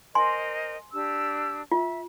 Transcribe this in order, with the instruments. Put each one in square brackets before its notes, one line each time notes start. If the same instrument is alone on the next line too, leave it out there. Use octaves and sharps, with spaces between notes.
[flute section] A#4 C5 D#5 [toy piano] G#5 C6
[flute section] D4 G4 E6
[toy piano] F4 [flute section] E5